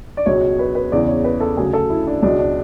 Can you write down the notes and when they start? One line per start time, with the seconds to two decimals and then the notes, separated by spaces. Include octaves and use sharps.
0.17 D5
0.26 C#2 B2 F#3 C#5
0.59 B4
0.75 B4
0.92 E2 C#3 E3 D5
1.08 C#5
1.24 B4
1.41 A4
1.57 D2 C#3 F#3 G#4
1.73 A4
1.90 E4
2.07 D4
2.23 C#2 B2 F#3 D4
2.39 D4